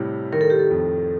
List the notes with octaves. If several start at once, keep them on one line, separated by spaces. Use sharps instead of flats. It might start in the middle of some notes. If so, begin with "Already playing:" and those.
Already playing: A2 C3 G3
D#3 A#4
A4
G4
A4
F2